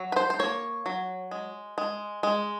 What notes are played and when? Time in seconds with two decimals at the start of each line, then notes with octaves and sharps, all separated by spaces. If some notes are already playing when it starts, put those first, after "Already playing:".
Already playing: F#3
0.12 B4
0.16 C5
0.30 C5
0.39 A#3 C#5
0.86 F#3
1.31 G#3
1.78 G#3
2.23 G#3